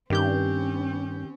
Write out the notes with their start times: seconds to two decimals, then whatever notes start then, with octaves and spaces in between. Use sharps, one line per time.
0.10 G2 D#3 C4 C#4 G4 G6